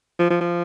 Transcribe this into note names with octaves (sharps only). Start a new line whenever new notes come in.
F3
F3
F3